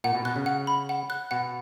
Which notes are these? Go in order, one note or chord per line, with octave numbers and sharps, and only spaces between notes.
A#2 F#5
B2
B2 F#6
C#3
F#5
B5
F#5
F#6
B2 F#5